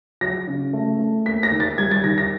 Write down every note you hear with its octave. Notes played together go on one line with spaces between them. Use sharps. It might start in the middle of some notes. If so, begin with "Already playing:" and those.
F#3 A#6
C#3
A3
A3
A#3 B6
A#6
D#3
A6
G3 G#6
A6
D#3 A#6
A#6